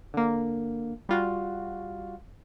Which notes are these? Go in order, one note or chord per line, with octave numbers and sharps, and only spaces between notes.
D3 A#3
G3 F4 F#4